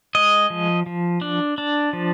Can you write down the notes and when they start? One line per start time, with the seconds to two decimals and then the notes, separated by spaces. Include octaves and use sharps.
0.15 G#3 D#5
0.50 F3
0.86 F3
1.21 D4
1.58 D4
1.93 F3